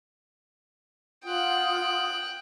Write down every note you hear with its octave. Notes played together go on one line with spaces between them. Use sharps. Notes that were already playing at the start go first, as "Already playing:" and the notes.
F4 F#5 G5 D#6 F#6